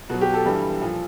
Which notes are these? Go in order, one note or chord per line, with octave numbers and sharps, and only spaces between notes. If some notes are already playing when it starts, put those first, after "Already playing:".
B2 F#3 F#4
G4
A4
G2 E3 G3
A#2 F3